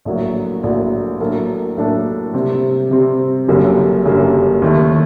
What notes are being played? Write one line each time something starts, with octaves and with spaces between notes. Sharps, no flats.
A#1 A2 F#3 A#3 F#4
A#1 A2 F#3 A#3 F#4
A2 F#3 A#3 D4 A4
A2 F#3 A#3 D4 A4
C3 G3 C4
C3 G3 C4
F#1 F#2 D3 G3 A#3
F#1 F#2 D3 G3 A#3
D#2 D#3 A3